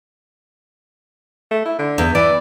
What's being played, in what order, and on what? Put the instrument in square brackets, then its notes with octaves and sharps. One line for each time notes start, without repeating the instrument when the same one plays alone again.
[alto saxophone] A3
E4
D3
[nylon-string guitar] E2
[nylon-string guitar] E3 [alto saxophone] D5